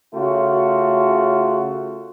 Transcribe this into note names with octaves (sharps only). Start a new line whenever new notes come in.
C#3 A3 F4 F#4